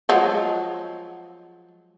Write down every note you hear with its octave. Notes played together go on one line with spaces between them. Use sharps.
F3 F#3 G#3